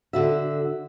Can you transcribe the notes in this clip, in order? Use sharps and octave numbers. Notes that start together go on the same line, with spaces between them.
D3 F#4 E5